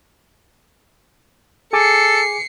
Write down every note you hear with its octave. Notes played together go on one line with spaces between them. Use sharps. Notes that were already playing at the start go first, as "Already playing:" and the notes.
G#4 A4 G#5 D6 C7 C#7